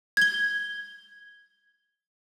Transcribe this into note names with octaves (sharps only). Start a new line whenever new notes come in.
G#6 G7